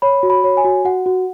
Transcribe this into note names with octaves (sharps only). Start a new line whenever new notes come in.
C#5 B5
F#4
B5
C#5
G#5
F#4
F#4 F#5
F#4